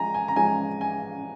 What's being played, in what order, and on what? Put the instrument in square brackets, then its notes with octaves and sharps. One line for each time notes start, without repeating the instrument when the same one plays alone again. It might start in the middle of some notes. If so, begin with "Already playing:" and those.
Already playing: [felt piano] F3 G#3 C#4 [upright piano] G#5 A#5
[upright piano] G#5
A#5
[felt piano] F3 G#3 C#4 G#4 [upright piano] G#5
[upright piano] G#5